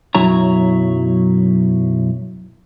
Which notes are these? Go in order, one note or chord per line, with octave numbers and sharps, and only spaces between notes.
B1 F#2 F#3 E4 C#5 A#5